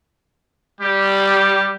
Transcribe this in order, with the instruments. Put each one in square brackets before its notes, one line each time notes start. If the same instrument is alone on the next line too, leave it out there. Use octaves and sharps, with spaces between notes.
[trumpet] G3 [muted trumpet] G4